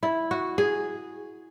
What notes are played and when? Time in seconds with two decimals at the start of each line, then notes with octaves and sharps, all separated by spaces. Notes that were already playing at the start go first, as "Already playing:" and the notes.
0.03 E4
0.31 F#4
0.58 G#4